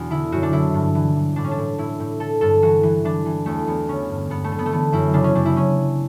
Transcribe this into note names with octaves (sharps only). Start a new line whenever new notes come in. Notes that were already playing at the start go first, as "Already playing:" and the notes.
Already playing: E2 B2 D4 F#4
D3 E4
F#2 F#4
D4
D3 E4
G2
E3
E3
A2 D4
C#4
D4
A2
A2 E4
A2
D3 A4
G2 A4
E3 F#4
E3
E3 D4
E3
E2 A3
E2 B3
D3 C#4
G2
G2 B3
A3
D3
B3
A3
E3 B3
F#2 E4
C#3 D4
C#4
F#2 D4
E4
C#4